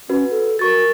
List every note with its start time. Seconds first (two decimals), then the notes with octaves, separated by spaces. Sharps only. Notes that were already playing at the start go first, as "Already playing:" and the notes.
0.09 C#4 F#4 B4
0.31 A4
0.59 F#4 A#4 C#6 A6